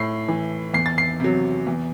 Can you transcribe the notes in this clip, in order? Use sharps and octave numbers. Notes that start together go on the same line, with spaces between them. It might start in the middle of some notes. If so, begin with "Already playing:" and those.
Already playing: A2 C7
E3
E2 C7
A6
C7
C3 F#3
E2